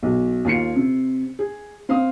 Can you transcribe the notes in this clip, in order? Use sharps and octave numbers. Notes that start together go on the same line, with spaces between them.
B1
D#2 F4 C7 C#7
C3
G#4
C4 F5 D#6